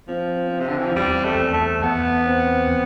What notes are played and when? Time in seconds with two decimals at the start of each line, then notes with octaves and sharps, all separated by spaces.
0.08 F3 C4
0.51 C4
0.60 C3
0.68 D3
0.78 E3
0.86 F3
0.95 E2 G3
1.25 A3
1.39 E2
1.54 A3
1.83 E2 B3
2.26 C4